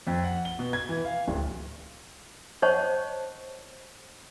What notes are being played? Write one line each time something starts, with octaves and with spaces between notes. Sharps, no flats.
F2
F#5
G7
B2
G#6
E3
F5
D1
C5 C#5 D#5 F#5 A5 C#6